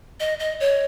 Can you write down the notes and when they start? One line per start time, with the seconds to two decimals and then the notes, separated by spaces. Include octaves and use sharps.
0.20 D#5
0.39 D#5
0.60 C#5